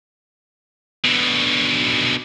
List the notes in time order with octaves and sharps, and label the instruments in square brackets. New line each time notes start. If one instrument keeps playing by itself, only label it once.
[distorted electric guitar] B2 D3